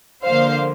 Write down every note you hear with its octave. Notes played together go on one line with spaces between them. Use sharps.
D3 F3 A#3 C5 F5